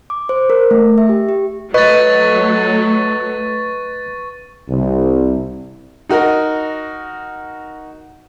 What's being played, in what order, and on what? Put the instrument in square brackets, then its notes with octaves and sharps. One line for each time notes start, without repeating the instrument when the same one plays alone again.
[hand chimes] D6
C5
A#4
A3
E5
G4
G4
[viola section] F#3 A3 [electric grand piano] B4 [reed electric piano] D#5 [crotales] C#6 A6
[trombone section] C2
[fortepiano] D#4 F#4 A#4 D#5